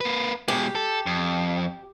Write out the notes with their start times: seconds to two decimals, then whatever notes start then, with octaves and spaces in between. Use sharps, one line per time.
0.01 A#3 B4
0.48 B2 G#3 G4
0.75 A4
1.06 F2